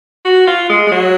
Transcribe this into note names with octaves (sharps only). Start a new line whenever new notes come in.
F#4
F4
G#3
G#3
F#3